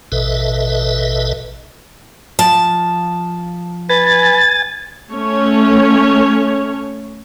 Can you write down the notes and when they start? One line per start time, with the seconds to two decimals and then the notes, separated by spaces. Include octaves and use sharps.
0.12 A1 B2 A4 B4 D#5 E5
2.39 F3 A5
3.89 B4 G#5 A6
5.12 A3 C#4 C#5